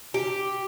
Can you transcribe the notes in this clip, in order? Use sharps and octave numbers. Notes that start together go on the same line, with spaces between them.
G4